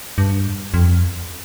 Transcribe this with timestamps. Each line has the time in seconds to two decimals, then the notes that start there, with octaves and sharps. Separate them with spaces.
0.18 G2
0.74 F2